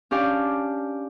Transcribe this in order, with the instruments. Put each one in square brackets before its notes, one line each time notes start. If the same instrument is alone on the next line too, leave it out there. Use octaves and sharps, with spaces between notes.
[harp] C#4 D4 G4 D5 F5